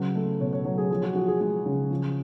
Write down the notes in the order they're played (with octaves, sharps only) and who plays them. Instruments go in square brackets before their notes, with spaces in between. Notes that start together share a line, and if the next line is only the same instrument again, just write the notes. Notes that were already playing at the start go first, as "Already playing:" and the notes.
Already playing: [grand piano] C#3 F#3 B4
A3
B2 C#5
C#5
F#3 C#5
G#4
F3 G#4
F#4
F3 F#4
G#4
G#3 G#4
C#3
F3